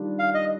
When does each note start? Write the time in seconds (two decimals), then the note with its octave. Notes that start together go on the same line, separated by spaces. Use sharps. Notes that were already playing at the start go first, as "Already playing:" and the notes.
Already playing: D#3 G3 D4 F4
0.19 F5
0.34 D#5